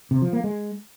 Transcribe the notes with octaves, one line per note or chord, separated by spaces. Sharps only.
C3
F3
A#3
G#3